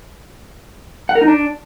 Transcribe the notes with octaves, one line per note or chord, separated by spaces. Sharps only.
F#5
A#4
D#4
D4